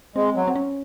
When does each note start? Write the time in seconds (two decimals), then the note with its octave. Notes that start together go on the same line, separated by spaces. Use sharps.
0.16 G#3 C4
0.35 F#3
0.48 C4
0.56 C#4